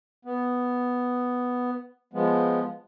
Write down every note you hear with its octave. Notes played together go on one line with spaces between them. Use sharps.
B3
F3 G#3 B3